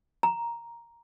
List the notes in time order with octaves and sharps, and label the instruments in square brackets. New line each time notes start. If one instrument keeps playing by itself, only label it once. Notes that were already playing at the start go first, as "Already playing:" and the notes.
[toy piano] A#5